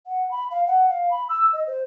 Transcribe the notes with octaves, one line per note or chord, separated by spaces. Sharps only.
F#5
B5
F5
F#5
F5
B5
E6
D#5
C5